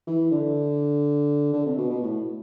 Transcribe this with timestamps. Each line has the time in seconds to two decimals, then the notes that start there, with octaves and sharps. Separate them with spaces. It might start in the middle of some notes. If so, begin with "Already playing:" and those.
0.07 E3
0.32 D3
1.53 D3
1.66 C3
1.78 B2
1.90 B2
2.03 A2